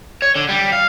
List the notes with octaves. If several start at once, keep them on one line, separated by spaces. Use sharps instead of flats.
C#5
D3
G3
F5